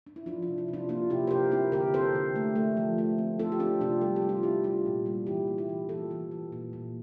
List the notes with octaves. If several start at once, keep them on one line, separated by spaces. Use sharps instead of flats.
D4
E4
F3 D4 F4
D4
C3
E4
C3
D4 F4
A#3 D4 F4
C3 E4 G4
C5
C3 G4 A#4
C4 E4 G4
D3 G4 A#4
C4 A4 C5
D3
A3
A3
F3
A3
C4
C4 F4 A4
G4
C4 D4 F4
C3 D4 F4
G3 A4
G4
G3
F4
C4 E4 G4
G3 D4 F4
A#2
G3
E3 E4 G4
A#3
E4 G4
E3
E3 F4 A4
E3
E3
A#2
A#2